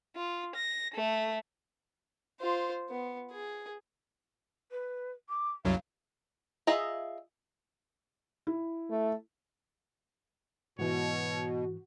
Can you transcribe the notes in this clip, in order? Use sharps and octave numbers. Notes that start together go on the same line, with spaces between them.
F4
A#6
A3
F4 C5
B3
G#4
B4
D6
C2 F#2 F#3 F5
F4 G#4 D#5 E5 A#5
E4
A3
G#2 B2 E3 F#4 C#5